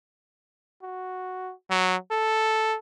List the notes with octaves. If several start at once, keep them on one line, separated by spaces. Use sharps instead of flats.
F#4
F#3
A4